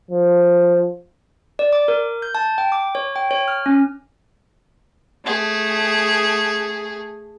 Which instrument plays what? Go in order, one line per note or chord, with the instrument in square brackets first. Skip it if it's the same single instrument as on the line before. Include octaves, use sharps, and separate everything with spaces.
[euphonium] F3
[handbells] D5
D6
A#4
G6
A5
G5
D6
C#5
G5
C#5
F6
C#4
[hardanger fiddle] A3 G#4